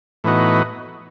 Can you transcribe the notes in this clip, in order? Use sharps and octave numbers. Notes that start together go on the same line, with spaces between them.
A2 E3 B3 D#4 F#4